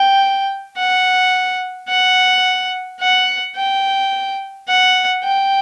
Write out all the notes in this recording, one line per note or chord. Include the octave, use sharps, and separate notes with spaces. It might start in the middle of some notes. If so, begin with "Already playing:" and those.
Already playing: G5
F#5
F#5
F#5
G5
F#5
G5